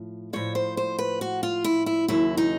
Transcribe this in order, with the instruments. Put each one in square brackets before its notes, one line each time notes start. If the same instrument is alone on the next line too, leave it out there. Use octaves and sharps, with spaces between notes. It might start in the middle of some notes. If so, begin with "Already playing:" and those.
Already playing: [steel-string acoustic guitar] A2 F3
A2 F3 C#5
C5
C5
B4
F#4
F4
E4
E4
D#2 C#3 F#3 E4
D#4